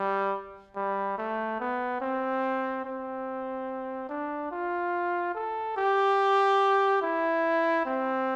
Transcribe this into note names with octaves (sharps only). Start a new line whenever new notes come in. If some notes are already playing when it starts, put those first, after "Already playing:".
Already playing: G3
G3
A3
B3
C4
C4
D4
F4
A4
G4
E4
C4